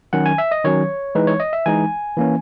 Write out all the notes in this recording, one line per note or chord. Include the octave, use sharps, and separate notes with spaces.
D#3 F#3 C#4 F#5
G#5
E5
D#5
D#3 F#3 C#4 C#5
E3 G#3 D#4 B4
C#5
D#5
E5
E3 G#3 D#4 G#5
E3 A#3 C#4